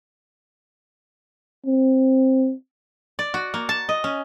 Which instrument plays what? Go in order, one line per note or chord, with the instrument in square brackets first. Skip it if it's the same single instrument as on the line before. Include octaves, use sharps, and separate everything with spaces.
[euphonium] C4
[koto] D5
F#4
A#3
A5
D#5
C#4